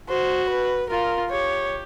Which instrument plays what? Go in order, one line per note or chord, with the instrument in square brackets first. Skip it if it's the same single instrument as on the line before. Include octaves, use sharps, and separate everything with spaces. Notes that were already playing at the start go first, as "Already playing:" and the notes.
[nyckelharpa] F#4 [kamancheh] C5
[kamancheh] B4
[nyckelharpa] F4 [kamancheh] A#4
[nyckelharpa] G4 [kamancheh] C#5